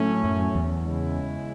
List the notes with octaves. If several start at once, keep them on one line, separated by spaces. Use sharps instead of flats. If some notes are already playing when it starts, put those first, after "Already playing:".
Already playing: A2 F#3 A3 C#4
F#2
E2
C#3 G#3 C#4 E4